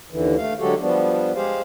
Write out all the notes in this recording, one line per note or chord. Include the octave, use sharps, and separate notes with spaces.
D#2 D3 E3
A3 F5
D3 F#3 G#3 F#4 G4 A4
F3 G3 B3 D4
G#3 G4 G#4 C5 F5